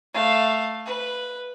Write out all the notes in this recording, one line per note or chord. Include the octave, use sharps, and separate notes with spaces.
A3 F5
B4